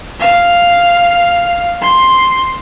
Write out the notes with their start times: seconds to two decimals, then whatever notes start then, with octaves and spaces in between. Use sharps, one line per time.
0.20 F5
1.82 C6